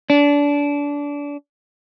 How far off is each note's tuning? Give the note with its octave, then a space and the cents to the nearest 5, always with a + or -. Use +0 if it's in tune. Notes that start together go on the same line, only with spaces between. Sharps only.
D4 -25